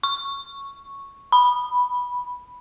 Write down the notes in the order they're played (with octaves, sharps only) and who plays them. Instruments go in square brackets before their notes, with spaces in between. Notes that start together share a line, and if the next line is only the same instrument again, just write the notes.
[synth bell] C#6
B5